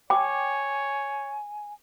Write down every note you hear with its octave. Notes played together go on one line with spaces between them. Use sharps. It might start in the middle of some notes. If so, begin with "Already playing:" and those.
C#5 G5 G#5 D6